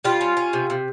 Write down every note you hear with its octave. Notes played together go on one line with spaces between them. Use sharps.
G3 F4
C#4
C#4
C3
C3